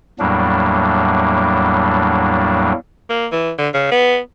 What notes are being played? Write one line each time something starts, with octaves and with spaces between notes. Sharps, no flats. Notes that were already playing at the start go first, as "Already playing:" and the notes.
E2 A2 F#3 G3 A#3 D4
A#3
E3
D3
C#3
B3